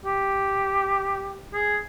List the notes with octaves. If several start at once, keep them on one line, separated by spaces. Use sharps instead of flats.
G4
G#4